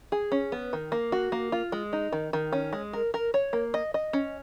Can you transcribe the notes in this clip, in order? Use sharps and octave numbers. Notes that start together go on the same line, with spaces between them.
G#4
C#4
B3
D#3
A#3
F#4
A#3
F4
G#3
D#4
D#3
D#3
C#4
G#3
A#4
A#4
C#5
A#3
D#5
D#5
C#4